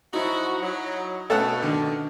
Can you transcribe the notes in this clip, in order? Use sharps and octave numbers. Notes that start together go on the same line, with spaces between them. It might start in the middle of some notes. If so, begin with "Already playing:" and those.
F3 F#3 D#4 E4 F#4
F#3
B2 A3 C#4 A4 F#5
D3 D#3